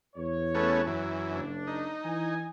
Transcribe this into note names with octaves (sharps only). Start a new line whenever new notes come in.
E2 C#5
A3 B3 C#4
F#2 E3
F#1 D4
D#4
E3 G#5